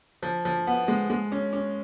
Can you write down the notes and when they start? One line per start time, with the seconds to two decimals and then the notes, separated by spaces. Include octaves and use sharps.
0.23 F3
0.45 F3
0.67 B3
0.88 G#3
1.10 G#3
1.32 C#4
1.53 C#4